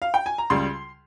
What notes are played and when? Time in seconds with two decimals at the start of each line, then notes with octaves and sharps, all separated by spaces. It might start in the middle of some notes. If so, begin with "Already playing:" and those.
0.02 F5
0.14 G5
0.26 G#5
0.38 A#5
0.50 C#2 C#3 G3 C6